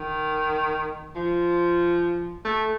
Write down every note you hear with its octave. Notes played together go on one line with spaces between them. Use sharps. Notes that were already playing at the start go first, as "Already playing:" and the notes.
Already playing: D#3
F3
A3